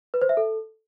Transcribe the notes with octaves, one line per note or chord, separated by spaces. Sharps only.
B4
C5
E5
A4